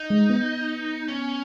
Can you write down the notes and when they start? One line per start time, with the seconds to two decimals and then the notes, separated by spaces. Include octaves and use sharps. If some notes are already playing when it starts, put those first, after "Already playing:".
Already playing: D#4
0.10 G#3
0.30 B3
1.08 C#4